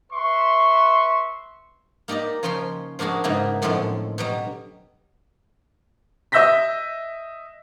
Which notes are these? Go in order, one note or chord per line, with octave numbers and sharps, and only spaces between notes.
B4 E5 C6 C#6
A#3 D#4 G4 D5 D#5
C#3 F3 C#4 C#5 G5 C6
F3 A#3 D4 F#4 G#4
G#2 C#3 A#3 B3 D#4 E4
F#2 A2 D3 F3 G#3 C4
B2 F#3 G3
D#5 E5 E6 G6 A#6 B6